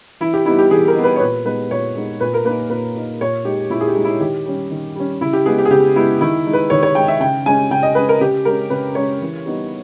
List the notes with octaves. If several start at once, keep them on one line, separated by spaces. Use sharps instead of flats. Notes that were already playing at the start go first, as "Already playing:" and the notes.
E3 E4
G4
G3 B3 D#4 E4
G4
E3 G#4
A#4
G3 B3 D#4
B4
C#5
A#2 B4
G#3 B3 D#4 B4
A#2 C#5
G#3 B3 D#4
A#2 B4
A#4
A#3 D#4 B4
A#2 B4
A#3 D#4
A#2 C#5
G#3 D#4 G4
A#2 E4
G#4
G4
G#3 D#4
E4
D#3 G4
G3 C#4
D#3
G3 C#4
C#3 E4
G4
G#3 B3 G#4
G4
G#4
C#3 G4
G#3 B3 E4
D#3 E4
G#3 D#4
B4
D#3 C#5
C#5
G#3 D#4 G5
E5
C#3 G5
G#3 C#4 G#5
C#3 G5
D#5
G#3 C#4 B4
A#4
C#3 G4
G#3 C#4 A#4
C#3 B4
G#3 C#4 C#5
E3
G3 B3 D#4